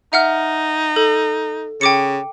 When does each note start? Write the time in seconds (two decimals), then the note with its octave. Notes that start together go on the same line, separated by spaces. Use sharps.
0.13 D#4 E5 F#5 F6
0.96 A4
1.81 C#3 G5 D6 C#7